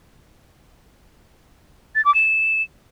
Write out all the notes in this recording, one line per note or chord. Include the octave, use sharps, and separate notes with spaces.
A6
D6
E7